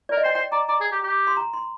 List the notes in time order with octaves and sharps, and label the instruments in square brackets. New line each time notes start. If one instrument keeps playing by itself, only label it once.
[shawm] A#4 [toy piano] D5
[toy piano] D#5
[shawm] C5 [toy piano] G5
[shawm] C5 [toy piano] G5
[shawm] D5 [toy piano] A#5
[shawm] D5 [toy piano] A#5
[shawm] G#4
G4
G4
[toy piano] C6
A#5
C6